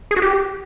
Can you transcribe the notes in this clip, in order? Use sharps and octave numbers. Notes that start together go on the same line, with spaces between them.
G#4
F#4
G4